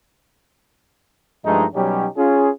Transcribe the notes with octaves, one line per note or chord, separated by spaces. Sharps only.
G2 F3 G#3 A3 D#4
B2 F#3 G3 C#4 D#4 G4
C#4 F4 G#4